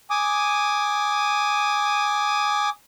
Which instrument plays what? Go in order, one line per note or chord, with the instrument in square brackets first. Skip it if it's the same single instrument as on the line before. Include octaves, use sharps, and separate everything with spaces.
[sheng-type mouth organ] G#5 D6 D#6